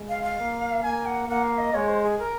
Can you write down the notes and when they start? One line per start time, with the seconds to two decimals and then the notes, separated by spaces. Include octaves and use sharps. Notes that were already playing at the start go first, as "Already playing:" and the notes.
Already playing: G#3
0.09 F5
0.23 F5
0.39 A#3
0.83 A#3 G#5
1.06 F#5
1.29 A#3 F#5
1.44 F5
1.58 D#5
1.74 G#3 C#5
1.88 C5
2.03 G#4
2.19 A#4